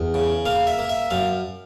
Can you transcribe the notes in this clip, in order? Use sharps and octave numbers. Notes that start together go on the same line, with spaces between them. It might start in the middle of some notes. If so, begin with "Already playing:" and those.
Already playing: E2
C#3
A#3 F5
E5
A#3
E5
F#2 F5